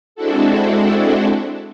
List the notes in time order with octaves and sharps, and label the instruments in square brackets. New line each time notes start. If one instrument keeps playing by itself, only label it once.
[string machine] G#3 C4 D4 E4 F#4 A4